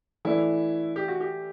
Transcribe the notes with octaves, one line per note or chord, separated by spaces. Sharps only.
E3 A3 D4 E4
G4
F#4
G4